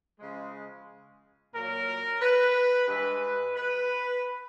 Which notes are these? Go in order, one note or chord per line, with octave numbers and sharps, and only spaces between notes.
C#3 F3 G#3
A#2 F#3 A#3 A#4
B4
G2 E3 G#3 B4
B4